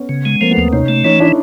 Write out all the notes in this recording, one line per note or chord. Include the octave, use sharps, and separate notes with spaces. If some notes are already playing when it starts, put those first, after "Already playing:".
Already playing: B3 C#4
C#3
G#3
F3 A#3 C4
A3 B3
D#2
C3 C#4 D#4
A3
E3 C#4 D#4
D4 E4